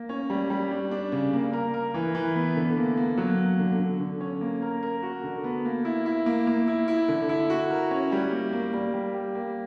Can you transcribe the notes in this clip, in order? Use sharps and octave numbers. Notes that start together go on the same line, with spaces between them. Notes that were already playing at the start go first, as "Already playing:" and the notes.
Already playing: A#3
C#4
G3
G3
D4
D4
C#3
A#3
A#4
A#4
E3
E3
B3
D3
A#3
A#3
F#3
A#3
D3
D3
D3
C#4
A#3
A#4
A#4
F#4
D3
B3
A#3
E4
E4
A#3
A#3
E4
E4
D3
E4
F#4
A#4
C#4
G3
A#3
A#3
G3
G3
G4
A#3